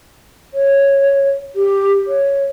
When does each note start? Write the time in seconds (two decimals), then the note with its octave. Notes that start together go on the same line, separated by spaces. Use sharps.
0.54 C#5
1.56 G4
2.07 C#5